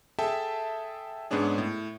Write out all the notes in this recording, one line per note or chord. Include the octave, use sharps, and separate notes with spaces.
G#4 A4 E5 G5 A5
G#2 B3 C#4 D4 G#4
A2